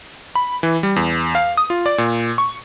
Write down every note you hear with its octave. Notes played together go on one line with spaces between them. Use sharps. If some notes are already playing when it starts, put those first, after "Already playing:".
B5
E3
G3
E2
F5
D#6
F4
D5
A#2
C#6